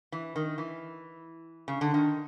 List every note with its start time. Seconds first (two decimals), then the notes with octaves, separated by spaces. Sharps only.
0.12 E3
0.36 D#3
0.58 E3
1.68 C#3
1.81 D3
1.94 D#3